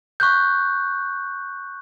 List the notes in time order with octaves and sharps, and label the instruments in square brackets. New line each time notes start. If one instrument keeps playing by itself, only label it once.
[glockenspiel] C#6 F#6 G6